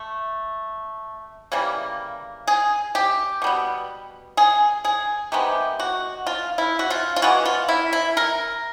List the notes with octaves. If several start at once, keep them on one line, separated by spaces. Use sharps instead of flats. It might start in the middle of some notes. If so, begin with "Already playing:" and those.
Already playing: A3
C#3 E3 G3 A#3
G#4
G4
B2 G3 B3
G#4
G#4
C3 D#3 G#3 B3 G4
F#4
F4
E4
F#4
F4
F4
E3 G#3 B3 F#4
F4
E4
E4
A#4